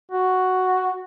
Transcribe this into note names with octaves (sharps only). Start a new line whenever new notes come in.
F#4